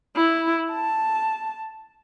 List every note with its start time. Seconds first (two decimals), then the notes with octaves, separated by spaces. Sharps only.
0.16 E4
0.72 A5